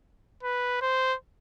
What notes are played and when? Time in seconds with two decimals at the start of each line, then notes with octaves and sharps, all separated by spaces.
0.43 B4
0.82 C5